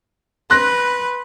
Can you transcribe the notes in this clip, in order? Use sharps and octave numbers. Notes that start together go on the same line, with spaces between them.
B4 C6 F#6 A#6